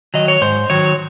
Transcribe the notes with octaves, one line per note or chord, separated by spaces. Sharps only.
D#3 F#3 D#5
C#5
G#2 C5
D#3 F#3 C#5